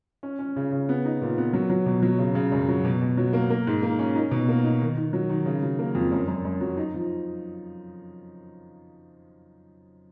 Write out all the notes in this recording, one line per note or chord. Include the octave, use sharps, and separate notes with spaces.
C#4
C#4
C#3
C#3
B3
D#4
A#2
B3
F#3
F#3
B2
F#3
C#3
C#3
F#2
F#3
B2
B2
F#3
A#3
A#3
G#2
A#3
C#4
D#4
B2
A#3
D#4
D#3
D#3
F#3
D#3
C#3
F#3
A#3
F2
F#2
F#2
F#2
F#3
D#4
F3